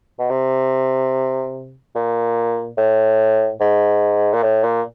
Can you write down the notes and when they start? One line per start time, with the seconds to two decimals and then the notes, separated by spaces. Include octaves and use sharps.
0.19 B2
0.30 C3
1.95 A#2
2.78 A2
3.60 G#2
4.33 A#2
4.43 A2
4.64 A#2